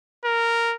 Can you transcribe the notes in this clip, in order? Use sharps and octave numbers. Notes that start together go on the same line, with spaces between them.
A#4